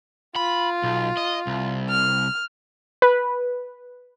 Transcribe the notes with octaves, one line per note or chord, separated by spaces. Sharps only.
F4 B5
B1
D#5
C2
F6
B4